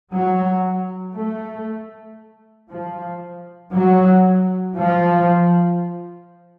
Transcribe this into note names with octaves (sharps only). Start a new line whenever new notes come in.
F#3
A3
F3
F#3
F3